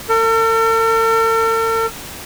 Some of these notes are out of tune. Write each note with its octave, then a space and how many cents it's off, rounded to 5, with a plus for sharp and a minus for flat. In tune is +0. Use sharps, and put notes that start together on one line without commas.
A4 +45